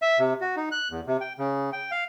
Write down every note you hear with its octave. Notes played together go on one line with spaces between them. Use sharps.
E5
C3
F#4
D#4
F#6
E2
C3
G5
C#3
G5
F5